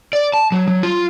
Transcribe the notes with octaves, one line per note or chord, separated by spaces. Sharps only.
D5
A5
F#3
F#3
F4